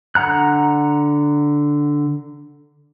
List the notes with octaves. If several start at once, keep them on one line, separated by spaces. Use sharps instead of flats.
D3 F#5 A#5 F#6